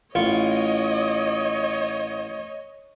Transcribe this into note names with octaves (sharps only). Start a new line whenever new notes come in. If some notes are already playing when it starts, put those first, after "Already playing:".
A1 F4 C#5 D#5 C#6